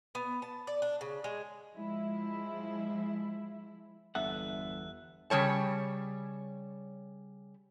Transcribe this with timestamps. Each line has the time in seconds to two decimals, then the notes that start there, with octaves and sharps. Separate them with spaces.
0.15 B3
0.42 A5
0.67 D5
0.82 D4
1.01 C#3
1.24 G#3
1.74 F3 G#3 E4
4.15 G1 E2 A4 E5 F#5 F#6
5.30 C#3 G3 C#5 A5